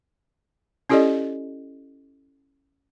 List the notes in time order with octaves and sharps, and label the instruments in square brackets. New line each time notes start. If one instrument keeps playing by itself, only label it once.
[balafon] C#4 E4 G4 A4 D5 D#5